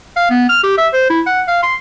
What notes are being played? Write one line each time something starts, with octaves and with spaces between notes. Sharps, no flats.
F5
B3
F6
G4
E5
C5
E4
F#5
F5
C6